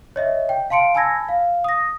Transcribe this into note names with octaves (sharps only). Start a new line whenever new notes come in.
C#5 D#5 E5
G5
F5 A5 C6 C#7 D7
G#5 A5 B5 E6 G#6 A#6
F5
D#6 A#6